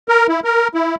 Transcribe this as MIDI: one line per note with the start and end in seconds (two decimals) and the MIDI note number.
0.08 0.27 70
0.28 0.40 64
0.44 0.68 70
0.74 0.95 64